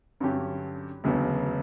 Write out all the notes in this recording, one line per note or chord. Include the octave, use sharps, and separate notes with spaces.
G2 D3 F#3 C#4 G4
E1 D2 C#3 F#3 B3